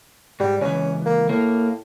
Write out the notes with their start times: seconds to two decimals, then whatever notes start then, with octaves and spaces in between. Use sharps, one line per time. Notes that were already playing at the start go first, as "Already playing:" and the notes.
0.40 G#2 G3
0.61 C#2 E3 C#4
1.05 A#3
1.29 A2 A#3